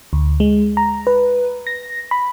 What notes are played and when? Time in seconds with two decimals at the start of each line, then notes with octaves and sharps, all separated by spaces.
0.13 D2
0.40 G#3
0.77 A#5
1.07 B4
1.67 A#6
2.11 B5